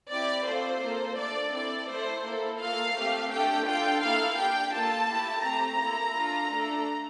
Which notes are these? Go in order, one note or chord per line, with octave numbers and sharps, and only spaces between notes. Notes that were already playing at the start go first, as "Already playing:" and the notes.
C4 E4 G4 D5
A3 C4 F4 A4 C5
A#3 F4 A4
A3 D4 A4 D5
C4 E4 A4 D5
A3 E4 A4 C5
A#3 E4 A4
A#3 F4 A4 F5
A3 C4 G4
A3 D4 G4 G5
D4 F4 A4 G5
A#3 E4 A4 F5
D4 G4 G5
A#3 F4 A4 A5
A3 E4 G4
A3 C4 G4 A#5
A#3 E4 A4
D4 F4 A4
A3 D4 A4